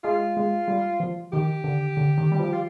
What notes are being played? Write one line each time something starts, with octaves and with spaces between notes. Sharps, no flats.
G#3 F4
G#3
G3
F3
D#3 G4
D3
D3
D#3
G3
F3
F4